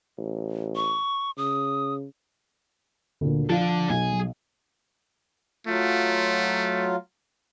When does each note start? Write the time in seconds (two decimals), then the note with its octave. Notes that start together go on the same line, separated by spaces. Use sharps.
0.18 A1
0.76 C#6
1.37 C#3 D#6
3.21 D2 A#2 D3
3.49 F3 D4 F4 A4 F5
3.90 B1 G#4
4.13 F#3
5.67 F#3 A3 F4 F5